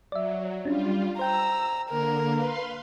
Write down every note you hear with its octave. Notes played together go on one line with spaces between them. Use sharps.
F#3 D5 E5
G3 C#4 D4 F4
C5 G5 A#5 E6 G6
D3 A#3 A#4
B4 F5 C6